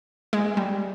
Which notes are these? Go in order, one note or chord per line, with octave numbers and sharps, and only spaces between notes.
G#3
G3